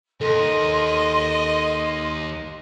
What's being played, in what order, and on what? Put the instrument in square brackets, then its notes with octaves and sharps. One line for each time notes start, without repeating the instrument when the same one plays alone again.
[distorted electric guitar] D#2 [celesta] A4 [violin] D#5 [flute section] C6